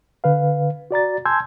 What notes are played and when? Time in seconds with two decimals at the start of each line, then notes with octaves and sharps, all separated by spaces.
0.24 D3 B4 F5
0.91 F#4 D5 A#5 A6
1.25 G#5 A5 C6 E6 G6 G#6